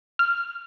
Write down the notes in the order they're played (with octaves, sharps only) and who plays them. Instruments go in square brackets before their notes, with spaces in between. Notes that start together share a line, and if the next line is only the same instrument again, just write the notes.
[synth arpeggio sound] F6